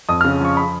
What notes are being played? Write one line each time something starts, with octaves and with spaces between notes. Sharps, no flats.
F2 D#6
C#3 F6
F3 C#6
B5